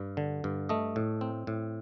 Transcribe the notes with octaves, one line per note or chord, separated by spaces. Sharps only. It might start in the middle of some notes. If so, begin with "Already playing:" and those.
Already playing: G2
D3
G2
A3 D#5
A2
C4
A2